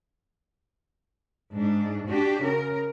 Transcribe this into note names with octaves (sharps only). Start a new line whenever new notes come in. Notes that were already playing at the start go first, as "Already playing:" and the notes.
G#2 D4
D4 F#4 G4
C#3 A#4